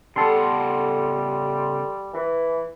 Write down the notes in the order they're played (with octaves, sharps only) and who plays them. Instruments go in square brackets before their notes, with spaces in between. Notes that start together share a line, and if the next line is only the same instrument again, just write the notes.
[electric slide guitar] C#3 B3 F#5 [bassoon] G3 [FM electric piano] A4 C6
[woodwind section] E3